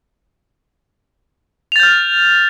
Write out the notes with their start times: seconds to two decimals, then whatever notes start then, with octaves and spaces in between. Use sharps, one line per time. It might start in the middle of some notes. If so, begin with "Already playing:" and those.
1.72 F7
1.76 A6
1.79 G6
1.83 F6